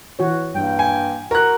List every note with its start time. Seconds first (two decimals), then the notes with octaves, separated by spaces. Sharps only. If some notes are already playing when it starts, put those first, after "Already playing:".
0.19 E3 F#4 C#5
0.55 G2 G3 A#3 G5
0.79 G#5
1.31 F#4 A#4 F#6